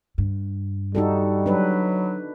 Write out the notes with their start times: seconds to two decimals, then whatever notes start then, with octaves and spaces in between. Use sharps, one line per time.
0.18 G2
0.95 G3 D#4 F#4 A4
1.46 F#3 D4 B4